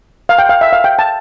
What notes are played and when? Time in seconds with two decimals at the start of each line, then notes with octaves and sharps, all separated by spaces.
0.29 F5
0.39 G5
0.49 F5
0.61 E5
0.73 F5
0.84 G5
0.99 A5